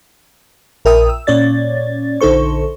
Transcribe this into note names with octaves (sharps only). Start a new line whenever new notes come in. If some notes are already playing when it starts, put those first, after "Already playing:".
A#1 A#4 E5 G5 D#6
E6
A#2 C#4 C#5 D5 A6
A#1 D3 D#4 A4 C5 C#6